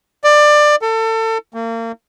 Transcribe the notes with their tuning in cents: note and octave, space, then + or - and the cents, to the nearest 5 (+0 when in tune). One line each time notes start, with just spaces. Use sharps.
D5 +20
A4 +30
A#3 -35